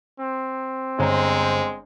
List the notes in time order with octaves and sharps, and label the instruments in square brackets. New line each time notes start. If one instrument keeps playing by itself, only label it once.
[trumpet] C4
[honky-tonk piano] G1 C5 A#5 [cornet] G#3